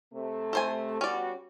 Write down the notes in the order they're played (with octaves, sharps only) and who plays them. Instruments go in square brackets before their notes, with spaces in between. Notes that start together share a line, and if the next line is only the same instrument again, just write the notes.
[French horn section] C3 A3
[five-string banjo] A4 C5 G#5
[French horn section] G3 B3 F#4 [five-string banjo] C#4 D5